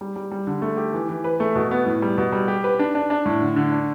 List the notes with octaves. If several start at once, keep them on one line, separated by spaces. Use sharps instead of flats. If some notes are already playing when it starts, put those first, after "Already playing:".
G3
G3
G3
D3
A3
G4
E3
E3
B4
A3
B2
B3
A2
G3
B2
G3
G4
B4
D4
D4
D4
A2
D3
D3
D4